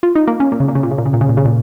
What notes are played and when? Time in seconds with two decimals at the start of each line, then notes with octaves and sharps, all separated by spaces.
0.03 F4
0.15 D#4
0.27 A#3
0.40 C#4
0.52 A#2
0.60 C#3
0.68 A#2
0.75 C#3
0.83 A#2
0.91 C#3
0.98 A#2
1.05 C#3
1.13 A#2
1.21 C#3
1.29 A#2
1.37 C#3
1.45 A#2